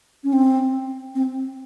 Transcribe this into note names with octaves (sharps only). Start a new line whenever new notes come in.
C#4
C4
C4